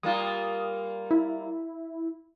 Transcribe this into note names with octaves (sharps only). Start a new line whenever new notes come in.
G3 A#3 F4 D#6
E4